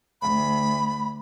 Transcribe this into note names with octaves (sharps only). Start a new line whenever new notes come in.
D2 B5